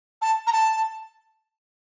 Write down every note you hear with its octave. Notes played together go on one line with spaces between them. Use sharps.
A5
A#5
A5